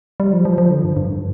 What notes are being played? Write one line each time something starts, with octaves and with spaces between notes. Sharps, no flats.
G3
F3
F3
F3
D3
G2
G2